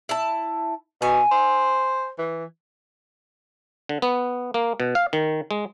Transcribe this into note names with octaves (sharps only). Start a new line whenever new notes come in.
E4 A5
B2 G#5
C5
E3
D3
B3
A#3
B2
F5
D#3
G#3